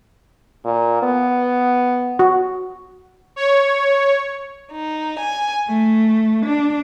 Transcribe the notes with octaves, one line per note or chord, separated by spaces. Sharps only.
A#2
B3
F#4
C#5
D#4
G#5
A3
D4